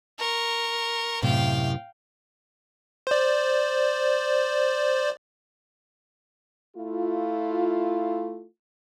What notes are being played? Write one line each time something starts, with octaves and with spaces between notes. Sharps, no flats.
A#4 C#6
F#2 A2 C3 F5 G5
C5 D5
A3 E4 F4